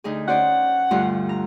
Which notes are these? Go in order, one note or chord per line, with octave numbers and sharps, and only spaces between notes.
D2 D#4 G#4
C#4 C5 D5 F#5
D2 G2 F4
A#5